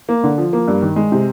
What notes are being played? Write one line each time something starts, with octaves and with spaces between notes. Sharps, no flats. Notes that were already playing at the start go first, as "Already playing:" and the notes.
A#3
D3
F3
A#3
G2
D#3
G#3
C3